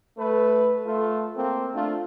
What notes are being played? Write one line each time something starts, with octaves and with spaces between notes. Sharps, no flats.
A3 B4
A3 F4
A#3 C4
A3 D4 F4